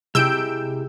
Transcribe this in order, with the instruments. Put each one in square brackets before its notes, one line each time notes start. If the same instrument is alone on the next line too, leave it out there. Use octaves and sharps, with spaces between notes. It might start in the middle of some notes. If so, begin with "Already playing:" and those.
[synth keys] C3 [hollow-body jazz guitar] G#3 E4 G4 [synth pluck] E6 G6 D7